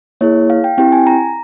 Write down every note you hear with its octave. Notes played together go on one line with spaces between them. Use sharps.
A#3 E4 G#4 C#5
F5
G5
C4 E4 G4 G5
G#5
A#5